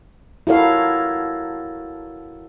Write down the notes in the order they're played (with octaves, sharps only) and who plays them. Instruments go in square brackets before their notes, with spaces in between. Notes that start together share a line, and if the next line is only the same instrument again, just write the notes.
[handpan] E4 F#4 A4 A#4 C#5 F5